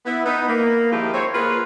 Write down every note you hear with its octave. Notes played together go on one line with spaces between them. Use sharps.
B3 E4
B3 D#4
A#3
D#3 F3 G#3 E4 F4 G4
C4 C#5
A#3 F4 G#4 A#4 B4